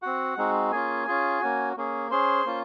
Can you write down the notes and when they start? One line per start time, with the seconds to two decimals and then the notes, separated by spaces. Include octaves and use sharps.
0.02 C4 F#4 F#5
0.37 G#3 C4 D#4 F#4
0.72 A#3 C#4 F4 G#4 G#5
1.07 C#4 F4 G#4
1.41 A#3 C#4 F#4
1.77 A#3 C#4 G#4
2.11 C#4 G#4 C5 C6
2.46 A#3 C#4 F4